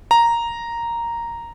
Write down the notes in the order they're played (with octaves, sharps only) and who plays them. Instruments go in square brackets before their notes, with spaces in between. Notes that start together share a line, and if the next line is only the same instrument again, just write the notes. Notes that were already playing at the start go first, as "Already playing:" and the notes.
[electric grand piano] A#5